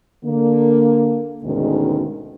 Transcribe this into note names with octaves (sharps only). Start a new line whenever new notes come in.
D3 A#3
D2 G#2 B2 D#3 G#3 C#4